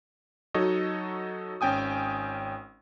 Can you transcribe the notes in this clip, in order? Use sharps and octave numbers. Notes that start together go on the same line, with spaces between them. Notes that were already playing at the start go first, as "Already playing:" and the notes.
F#3 D#4 F#4 A4 C#5 D#5
G#1 C#4 G5 G#5 D#6